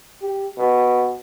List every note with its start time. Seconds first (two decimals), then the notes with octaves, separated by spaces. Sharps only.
0.22 G4
0.58 B2